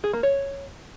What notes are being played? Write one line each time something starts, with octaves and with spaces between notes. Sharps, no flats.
G#4
A#3
C#5